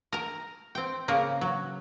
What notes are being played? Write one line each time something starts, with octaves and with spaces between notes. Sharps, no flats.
A#4 A#5
C4 G5
C#3 A#3 A#4
F#3